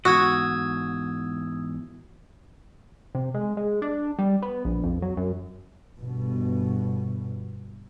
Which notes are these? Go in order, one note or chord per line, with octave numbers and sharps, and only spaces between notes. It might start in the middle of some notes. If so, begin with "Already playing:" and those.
E2 G#2 F#4 D#6 E6 G#6
C3
G#3
G#3
D4
G3
B3
A#1
F2
F#3
F#2
G1 B2